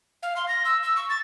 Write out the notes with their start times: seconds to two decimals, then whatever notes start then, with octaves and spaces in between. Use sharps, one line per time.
0.23 F5
0.36 C6
0.48 A#6
0.65 E6
0.83 E6
0.96 C#6
1.09 A6